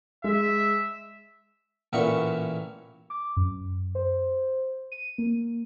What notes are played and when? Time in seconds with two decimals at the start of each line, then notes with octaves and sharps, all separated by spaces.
0.24 G#3 E5
1.93 A1 A#2 E3 F#5 C#6
3.10 D6
3.36 F#2
3.95 C5
4.92 D#7
5.18 A#3